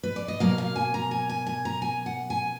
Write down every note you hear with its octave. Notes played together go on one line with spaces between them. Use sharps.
B4
D5
D#5
B2 F#3 A#3 F5
F5
G#5
A#5
G#5
G#5
G#5
A#5
G#5
F#5
G#5